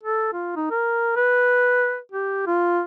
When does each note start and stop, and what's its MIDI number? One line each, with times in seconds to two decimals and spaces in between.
0.03 0.29 69
0.33 0.52 65
0.56 0.70 63
0.71 1.16 70
1.16 1.99 71
2.12 2.42 67
2.47 2.81 65